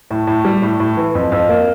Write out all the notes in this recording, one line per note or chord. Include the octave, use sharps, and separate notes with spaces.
A2
A2
G3
A2
A2
E3
F2
F2
A#3